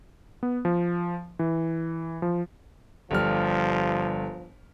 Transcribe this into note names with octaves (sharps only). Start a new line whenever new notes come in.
B3
F3
E3
F3
G1 F3 G3 F6